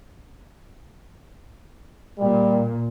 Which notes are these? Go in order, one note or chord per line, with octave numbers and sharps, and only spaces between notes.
A#2 G3